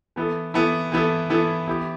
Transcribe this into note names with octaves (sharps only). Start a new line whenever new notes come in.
E3 B3 E4 A4
E3 B3 E4 A4
E3 B3 E4 A4
E3 B3 E4 A4
E3 B3 E4 G4